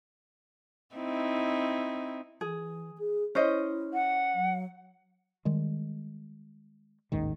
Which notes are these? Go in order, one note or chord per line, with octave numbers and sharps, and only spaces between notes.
C4 D#4 E4
E3 G#4
G#4
C#4 E4 C5 D#5
F#5
F#3
D#3 G3 G#3
A1 D#2 G#2 D#3